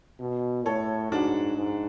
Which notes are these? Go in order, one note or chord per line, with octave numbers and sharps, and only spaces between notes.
B2
A2 A4 C#5
G#2 D4 F#4
G#2